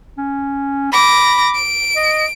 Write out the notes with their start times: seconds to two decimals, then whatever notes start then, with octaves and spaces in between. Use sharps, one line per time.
0.18 C#4
0.93 B5 D6 A#6
1.55 D7
1.96 D#5